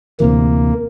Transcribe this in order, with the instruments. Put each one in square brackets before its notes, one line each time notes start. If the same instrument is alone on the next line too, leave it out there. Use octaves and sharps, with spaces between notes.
[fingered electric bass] D2 C3 E3 [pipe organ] A#3